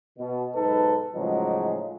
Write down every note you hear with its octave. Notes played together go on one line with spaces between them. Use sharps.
B2
B1 G#2 D#4 A4 B4
A2 C#3 F3 F#3 G#3 D#4